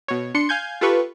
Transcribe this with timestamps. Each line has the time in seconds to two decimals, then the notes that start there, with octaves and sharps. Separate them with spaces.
0.08 B2 C#5
0.34 D4 C6 C#7
0.49 F5 G#5 G6 G#6
0.81 F4 G4 A4 B4 C#6